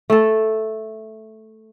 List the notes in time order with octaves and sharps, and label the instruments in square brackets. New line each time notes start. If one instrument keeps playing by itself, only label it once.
[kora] A3 A4